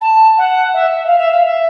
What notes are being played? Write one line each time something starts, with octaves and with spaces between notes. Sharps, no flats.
A5
F#5
E5
E5
F5
E5
F5
E5